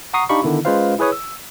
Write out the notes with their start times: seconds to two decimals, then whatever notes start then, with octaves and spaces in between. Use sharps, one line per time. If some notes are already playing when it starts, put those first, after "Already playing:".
0.14 F#5 A#5 C#6 D#6 C7
0.29 D4 D#4 G4 F5 B5 C#6
0.43 D3 D#3 B3 E4
0.65 G#3 C#4 F4 B4 C5 F5
0.99 E4 G#4 B4 C#5 D#6
1.12 E6